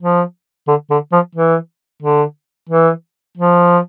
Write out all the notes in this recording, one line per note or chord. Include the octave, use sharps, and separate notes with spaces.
F3
D3
D3
F3
E3
D3
E3
F3